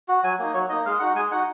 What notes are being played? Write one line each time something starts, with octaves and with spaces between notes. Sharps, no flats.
F#4
F#3 G#5
A#3 D#4
F#3 C#5
A#3 D#4 D#5
G#3 F5
D#4 F#4 F#5
G#3 G#5
D#4 F#4 F#5